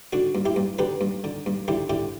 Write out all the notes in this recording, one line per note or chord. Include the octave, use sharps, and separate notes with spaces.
D3 D4 F#4
G2
E4 G4
G2
D3 G4 B4
G2
D3
G2
D3 E4 G4
D3 E4 G4